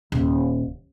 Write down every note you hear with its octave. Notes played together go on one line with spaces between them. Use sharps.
D#1